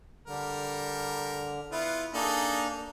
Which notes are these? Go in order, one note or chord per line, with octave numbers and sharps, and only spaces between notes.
D3 G3 A#4
B3 E4 F4
A#3 D4 D#4 G#4 A4